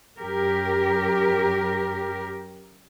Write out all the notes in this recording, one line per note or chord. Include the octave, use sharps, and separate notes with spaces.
F#2 G4 A#4